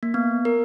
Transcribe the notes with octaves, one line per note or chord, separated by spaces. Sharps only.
A#3
B3
A#4